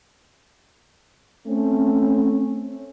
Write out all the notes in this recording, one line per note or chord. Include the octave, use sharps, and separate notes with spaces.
A3 C4 C#4